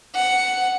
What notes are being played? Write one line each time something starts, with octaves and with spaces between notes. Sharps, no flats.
F#5